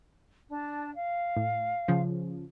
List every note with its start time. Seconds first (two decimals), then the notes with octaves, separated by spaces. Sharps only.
0.49 D4 A5
0.93 F5
1.37 A2
1.88 C#3 F3